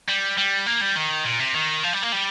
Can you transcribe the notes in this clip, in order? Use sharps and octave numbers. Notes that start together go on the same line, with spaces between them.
G3
G3
A#3
G3
D#3
A#2
C3
D#3
F3
G3
A#3
G3